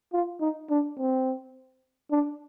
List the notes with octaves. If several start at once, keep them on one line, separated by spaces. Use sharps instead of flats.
F4
D#4
D4
C4
D4